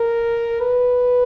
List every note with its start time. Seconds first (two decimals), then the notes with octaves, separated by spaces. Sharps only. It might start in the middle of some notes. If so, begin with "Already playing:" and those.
Already playing: A#4
0.60 B4